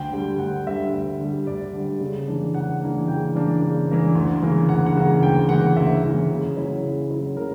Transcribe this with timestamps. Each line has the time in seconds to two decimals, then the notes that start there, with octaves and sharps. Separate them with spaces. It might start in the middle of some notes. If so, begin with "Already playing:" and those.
Already playing: D2 G5
0.12 D3 G3
0.39 D2 F#5
0.66 D3 G3 E5
0.93 D2
1.20 D3 G3
1.47 D2 D5
1.73 D3 G3
2.01 C#3
2.27 E3 A#3 D4
2.54 C#3 F#5
2.81 E3 A#3 D4
3.08 C#3 G5
3.35 E3 A#3 D4
3.62 C#3
3.89 E3 A#3 D4
4.15 D2
4.42 C#3 E3 A#3
4.69 D2 F#5
4.86 F#5
4.96 C#3 E3 A#3
5.22 D2 G5
5.49 C#3 E3 A#3 F#5
5.76 D2 E5
6.04 C#3 E3 A#3
6.31 C#3
6.56 F#3 C#4 E4
6.83 C#3
7.10 F#3 C#4 E4
7.37 C#3 A#4